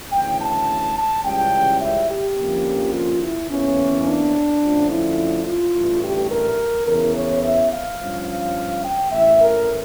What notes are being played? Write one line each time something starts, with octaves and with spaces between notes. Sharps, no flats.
D2 C#3 E3 G5
A5
A5
C#2 C#3 E3 G3 G5
E5
G4
F2 D3 F3 A#3 C#4
F4
E4
E2 C#3 E3 A#3 C#4
D4
F2 D3 F3 A3 C#4
E4
F4
A1 G2 E3 A3
G4
A#4
E2 C#3 E3 A#4
C#5
E5
F5
G2 F3 C#4
F5
G5
A1 A2 E3 E5
A#4